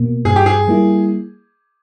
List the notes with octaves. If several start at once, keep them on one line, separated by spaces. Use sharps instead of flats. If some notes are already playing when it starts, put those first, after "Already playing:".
Already playing: B2 A#3
G2 G#4
G4
G#4
G3 A#3 E4